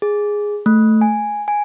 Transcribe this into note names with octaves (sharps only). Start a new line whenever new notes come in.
G#4
A3
G#5
G#5